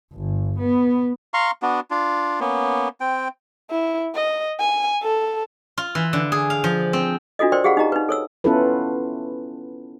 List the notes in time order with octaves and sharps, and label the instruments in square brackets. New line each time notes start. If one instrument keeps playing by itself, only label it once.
[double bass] G1
B3
[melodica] F5 A#5 C6 C#6
B3 D4 F#4
D4 F4
A#3 B3 C#4
C4 G5
[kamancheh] E4
D#5
G#5
A4
[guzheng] F4
E3
D3
G#4
F5
F3
C4
[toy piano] D4 F4 F#4 A4 D#5
A#4 C5 D5 G5 C6
G4 G#4 F5 F#5 B5
D#4 G4 D#5 A#5
D#4 B4
A4 C#5 E6
[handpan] B3 C#4 E4 F4 A4 B4